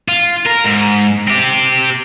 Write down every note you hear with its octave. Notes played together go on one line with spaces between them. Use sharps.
F4
A#4
G#2
C4 G4